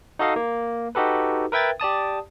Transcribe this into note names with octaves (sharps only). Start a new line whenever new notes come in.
D#4 F#4 A4 D#5 F5
A#3
D#4 F#4 G4 A4 B4
A#4 B4 E5 G5 G#6 A6
G4 D5 A5 D#6